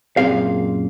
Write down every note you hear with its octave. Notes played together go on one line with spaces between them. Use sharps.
F#2 A#2 F3 C4 G#4 F5